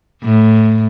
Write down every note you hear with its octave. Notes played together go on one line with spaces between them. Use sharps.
A2